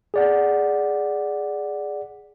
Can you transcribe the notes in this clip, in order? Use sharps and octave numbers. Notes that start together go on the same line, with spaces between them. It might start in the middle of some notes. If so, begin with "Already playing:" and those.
G#4 D5 F#5